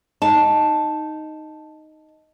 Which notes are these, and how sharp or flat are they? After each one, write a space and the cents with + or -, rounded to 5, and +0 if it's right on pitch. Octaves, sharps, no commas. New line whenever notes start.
D#4 +0 A5 +0